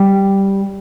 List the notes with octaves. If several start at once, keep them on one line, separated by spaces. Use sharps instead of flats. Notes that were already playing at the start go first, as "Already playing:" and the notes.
Already playing: G3